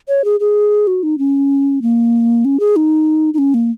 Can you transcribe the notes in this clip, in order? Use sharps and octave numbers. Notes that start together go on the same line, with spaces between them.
C#5
G#4
G#4
F#4
D#4
C#4
A#3
C#4
G#4
D#4
D#4
C#4
A#3